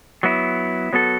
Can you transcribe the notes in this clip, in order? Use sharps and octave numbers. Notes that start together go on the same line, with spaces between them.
F#3 B3 E4
F#3 B3 F#4 A4